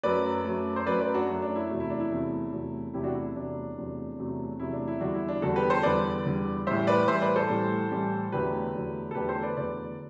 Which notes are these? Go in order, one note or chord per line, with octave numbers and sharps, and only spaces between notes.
F#2 F#3 A3 B4 D5
F#2 F#3 A3
C5
F#2 F#3 A3 B4 D5
B4 D5
D4 F#4
F#2 F#3 A3
D4
E4
E2 C3 F#3 A3
E4
D4
E4
E2 C3 F#3 A3
E2 C3 F#3 A3
E2 C3 F#3 A3 E4 G4
D4 F#4
E4
E4
E2 C3 F#3 A3 D4
E2 C3 F#3 A3
E2 C3 F#3 A3
E2 C3 F#3 A3 E4
D4
E4
E2 D3 G3 D4 F#4
E4
D4
E2 D3 G3 F#4 A4
G4 B4
A4 C5
E2 D3 G3 B4 D5
E2 D3 G3
A2 E3 G3 C5 E5
B4 D5
A2 E3 G3 C5 E5
B4 D5
A4 C5
A2 E3 G3
A2 E3 G3
E2 D3 F#3 A3 G4 B4
E2 D3 F#3 A3
A4
E2 D3 F#3 A3 G4 B4
A4 C5
B4 D5
E2 D3 F#3 A3 B4 D5